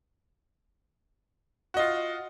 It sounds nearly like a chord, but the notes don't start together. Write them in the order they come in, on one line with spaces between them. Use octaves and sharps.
F#4 D#5 F4